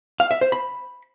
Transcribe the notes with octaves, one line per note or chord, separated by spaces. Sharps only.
F5
E5
C5
B5